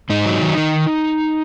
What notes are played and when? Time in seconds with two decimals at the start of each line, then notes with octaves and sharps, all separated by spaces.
0.10 G#2 D#4
0.26 F#3
0.42 D#3
0.57 D#3